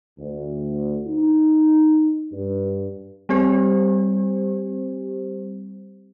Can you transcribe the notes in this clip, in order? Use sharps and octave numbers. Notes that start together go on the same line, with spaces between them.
D2
D#4
G2
G3 C4 G4 C5